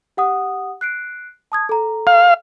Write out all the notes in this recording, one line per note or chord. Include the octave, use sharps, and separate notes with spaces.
G4 F#5 D#6
F#6 C7 D7
A5 D#6 G#6
A4 A#5
F5